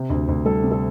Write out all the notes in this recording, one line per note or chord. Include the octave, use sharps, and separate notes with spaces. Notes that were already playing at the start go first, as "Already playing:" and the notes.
Already playing: C3
D2
D2
G3 A4
C3
A4